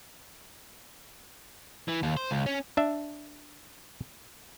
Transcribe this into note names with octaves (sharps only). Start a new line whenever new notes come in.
E3
D#2
C5
C#2
C#4
D4 E5